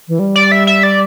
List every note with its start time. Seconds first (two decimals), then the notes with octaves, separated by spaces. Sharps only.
0.08 E3
0.19 G3
0.36 D5
0.52 E5
0.67 E5
0.83 D5